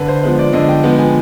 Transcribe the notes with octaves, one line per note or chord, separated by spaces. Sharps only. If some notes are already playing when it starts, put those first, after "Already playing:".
Already playing: D3 B4
C5
F3 G#3 B3 B4
D5
D3 D#5
G5
F3 G#3 B3
G#5